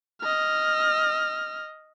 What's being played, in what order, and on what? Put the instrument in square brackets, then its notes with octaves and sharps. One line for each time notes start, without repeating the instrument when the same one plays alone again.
[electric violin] D#5 F6